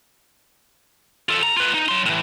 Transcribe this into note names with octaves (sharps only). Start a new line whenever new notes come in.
F4 A4
A#5
F4 B4
D#4
F#3 C6
A2 E3